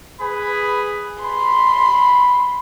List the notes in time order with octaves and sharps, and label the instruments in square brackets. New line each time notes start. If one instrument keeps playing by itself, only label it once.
[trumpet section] G#4 B4 B5
[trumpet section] B5 [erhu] C6